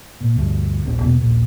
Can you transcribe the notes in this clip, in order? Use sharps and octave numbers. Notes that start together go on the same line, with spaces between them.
A#2
D2 G2
D#1 A#1 A#2 C4
E2 B2 A#3
D#1 A#1 A#2